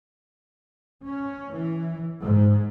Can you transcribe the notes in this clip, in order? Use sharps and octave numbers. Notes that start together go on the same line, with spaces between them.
C#4
E3
G#2